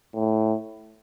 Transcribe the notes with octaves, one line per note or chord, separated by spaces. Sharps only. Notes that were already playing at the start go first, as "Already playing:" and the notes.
A2